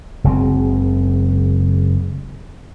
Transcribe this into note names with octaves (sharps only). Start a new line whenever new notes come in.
F#1 C#3 G#3 C4